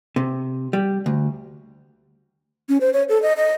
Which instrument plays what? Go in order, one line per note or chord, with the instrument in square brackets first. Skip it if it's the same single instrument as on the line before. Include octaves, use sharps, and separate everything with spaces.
[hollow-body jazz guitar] C3
G3
D2
[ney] C#4
C5
C#5
A4
D#5
D#5